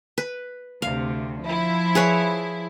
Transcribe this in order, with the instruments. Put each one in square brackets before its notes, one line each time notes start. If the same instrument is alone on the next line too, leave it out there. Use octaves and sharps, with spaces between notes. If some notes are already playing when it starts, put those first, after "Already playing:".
[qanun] B4
[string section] D2 C3 [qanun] F5
[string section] F3 E4
[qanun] G#4 B4 C#5